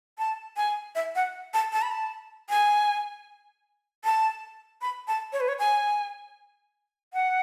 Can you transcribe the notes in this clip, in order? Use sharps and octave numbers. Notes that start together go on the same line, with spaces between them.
A5
G#5
E5
F#5
A5
A5
B5
A5
G#5
A5
B5
A5
C#5
B4
C#5
G#5
F#5